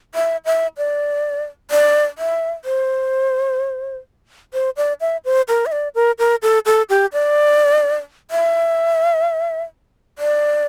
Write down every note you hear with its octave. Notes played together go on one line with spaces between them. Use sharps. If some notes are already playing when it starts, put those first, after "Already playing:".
E5
E5
D5
D5
E5
C5
C5
D5
E5
C5
A#4
E5
D5
A#4
A#4
A4
A4
G4
D5
E5
D5